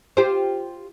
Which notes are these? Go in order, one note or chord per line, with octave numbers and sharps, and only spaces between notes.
F4 G4 C5